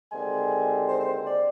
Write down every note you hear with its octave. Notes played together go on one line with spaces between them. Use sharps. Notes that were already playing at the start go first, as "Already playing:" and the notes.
D#2 D3 G#3 C4 G#5
C5
C5
D5